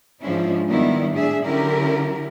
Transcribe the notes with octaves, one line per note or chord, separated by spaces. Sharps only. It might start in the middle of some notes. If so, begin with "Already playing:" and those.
G#2 F3 C#4 D4 E4
D#3 G3 B3 D4 E4
A2 D4 G#4 E5
D3 F#3 C#4 E4 G4 A#4